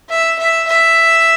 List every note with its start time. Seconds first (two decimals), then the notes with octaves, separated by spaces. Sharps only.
0.08 E5
0.39 E5
0.67 E5